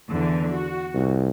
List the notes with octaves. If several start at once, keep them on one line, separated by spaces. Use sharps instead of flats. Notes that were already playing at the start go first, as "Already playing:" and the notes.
E2 D3 E3
F#4
C2